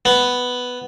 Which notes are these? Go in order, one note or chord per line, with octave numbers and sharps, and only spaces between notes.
B3